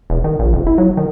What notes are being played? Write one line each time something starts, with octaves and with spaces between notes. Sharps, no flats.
E1
D#3
A#1
F1
E4
F#3
D#3